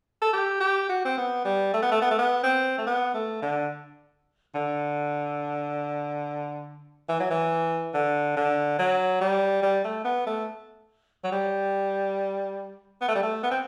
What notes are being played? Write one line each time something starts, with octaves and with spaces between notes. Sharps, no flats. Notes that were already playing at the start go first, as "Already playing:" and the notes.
A4
G4
G4
F#4
C4
B3
G3
A3
B3
A3
B3
A3
B3
C4
A3
B3
A3
D3
D3
E3
F#3
E3
D3
D3
F#3
G3
G3
A3
B3
A3
F#3
G3
B3
A3
G3
A3
B3
C4